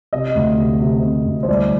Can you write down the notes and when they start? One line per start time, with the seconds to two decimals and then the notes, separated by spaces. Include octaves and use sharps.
0.13 C3 D#5
0.35 D2
0.58 C3
0.80 C3
1.03 C3
1.26 D2
1.43 C5
1.48 C2 D5